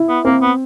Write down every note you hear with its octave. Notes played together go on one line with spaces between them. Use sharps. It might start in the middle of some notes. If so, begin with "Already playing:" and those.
Already playing: E4
B3
A#3 C4
B3